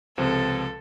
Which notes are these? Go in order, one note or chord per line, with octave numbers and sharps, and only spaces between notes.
C#2 C3 F3 A4